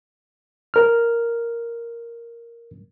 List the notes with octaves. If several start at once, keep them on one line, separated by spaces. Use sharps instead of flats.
A#4 F6